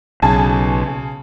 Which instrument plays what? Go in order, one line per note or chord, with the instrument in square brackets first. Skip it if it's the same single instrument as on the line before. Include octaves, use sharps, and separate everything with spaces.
[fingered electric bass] B1 [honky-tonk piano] C#3 G#5 A5